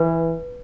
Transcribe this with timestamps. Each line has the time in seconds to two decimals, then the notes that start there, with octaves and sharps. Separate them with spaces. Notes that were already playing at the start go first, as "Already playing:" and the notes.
Already playing: E3 B4